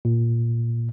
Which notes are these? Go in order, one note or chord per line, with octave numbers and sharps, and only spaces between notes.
A#2